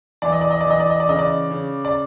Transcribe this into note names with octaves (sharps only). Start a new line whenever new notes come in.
E3 D5
D#5
D5
D#5
E3 D5
D#5
D5
D#5
D5
C#3 D#5
D5
C#3
D5